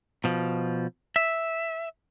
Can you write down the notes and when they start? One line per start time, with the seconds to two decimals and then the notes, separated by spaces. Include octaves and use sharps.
0.24 B2 F3
1.16 E5